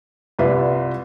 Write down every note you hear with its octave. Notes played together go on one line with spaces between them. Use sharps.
C2 F4 B4 D5 E5